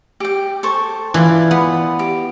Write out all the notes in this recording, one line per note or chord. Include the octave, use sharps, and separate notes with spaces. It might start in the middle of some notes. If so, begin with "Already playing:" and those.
G4 G5
A4 C5 C#6
E3 F4 D5
B3
G4